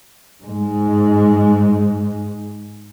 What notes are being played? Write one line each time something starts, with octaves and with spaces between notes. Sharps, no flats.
G#2 G#3